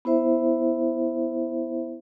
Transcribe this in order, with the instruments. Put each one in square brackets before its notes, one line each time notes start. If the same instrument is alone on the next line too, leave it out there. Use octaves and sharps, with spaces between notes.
[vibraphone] B3 E4 C5 E5